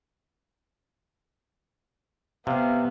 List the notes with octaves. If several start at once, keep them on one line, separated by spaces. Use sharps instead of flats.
C3 B3 F5